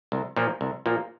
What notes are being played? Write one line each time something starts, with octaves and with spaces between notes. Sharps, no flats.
C2
A#2 F3 A#3
C2
A#2 F3 A#3